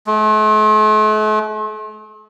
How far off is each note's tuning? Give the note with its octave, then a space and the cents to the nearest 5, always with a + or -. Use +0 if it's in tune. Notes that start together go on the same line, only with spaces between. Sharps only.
A3 -45